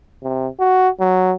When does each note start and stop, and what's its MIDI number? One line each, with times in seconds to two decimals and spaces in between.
0.23 0.47 48
0.60 0.89 66
1.00 1.34 54